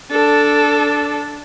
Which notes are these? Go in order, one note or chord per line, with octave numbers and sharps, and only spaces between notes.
D4 A4